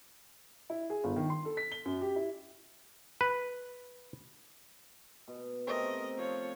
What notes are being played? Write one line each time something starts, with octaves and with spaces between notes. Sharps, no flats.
E4
G#4
G1
D#3
C6
A4
B6
G7
F#2
G4
E4
B4
B2
C3 A3 C4 A#4 D#5
F3 C#5